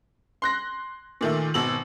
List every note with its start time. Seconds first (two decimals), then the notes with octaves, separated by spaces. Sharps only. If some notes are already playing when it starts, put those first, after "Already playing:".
0.42 C6 F#6 A#6
1.21 A#2 D#3 A3
1.54 G#1 B2 E6 F#7